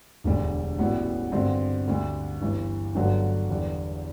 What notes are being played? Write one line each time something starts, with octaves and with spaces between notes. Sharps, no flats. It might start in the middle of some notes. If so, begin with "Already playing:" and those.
E1 D2 D3 G3
A1 A2 G3 B3 F#4
G2 D3 G3 C4 F#4
D2 D3 G3
G1 G2 E3
G1 G2 D3 F#3 A3
E2 D3 G3 D4